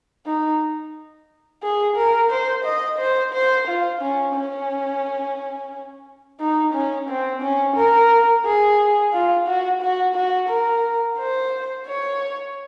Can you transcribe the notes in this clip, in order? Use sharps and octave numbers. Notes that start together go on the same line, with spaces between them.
D#4
G#4
A#4
C5
D#5
C5
C5
F4
C#4
C#4
D#4
C#4
C4
C#4
A#4
G#4
F4
F#4
F#4
F#4
A#4
C5
C#5